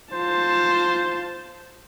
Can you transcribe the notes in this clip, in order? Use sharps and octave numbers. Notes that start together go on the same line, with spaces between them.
F4 C5 A5